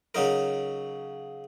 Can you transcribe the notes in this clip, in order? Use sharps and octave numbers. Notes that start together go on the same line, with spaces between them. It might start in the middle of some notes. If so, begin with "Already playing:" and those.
C#3 F#3 D#4 A#4